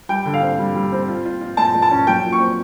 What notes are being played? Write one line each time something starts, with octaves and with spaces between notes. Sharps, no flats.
G3 G5
D3
F5
C4
G3
G3
C4
F4
F4
F4
G#3 A5
G#3
A5
C#4
F#3 G5
A#2
C#6
C4